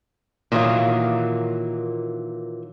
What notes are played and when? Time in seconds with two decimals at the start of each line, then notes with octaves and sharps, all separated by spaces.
0.52 A#2 D#3 E3 F#3 A#3